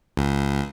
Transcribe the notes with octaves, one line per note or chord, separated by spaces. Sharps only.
C#2